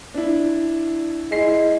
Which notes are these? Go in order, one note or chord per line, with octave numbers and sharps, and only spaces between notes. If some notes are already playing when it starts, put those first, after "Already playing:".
D4 E4
G#3 E4 C7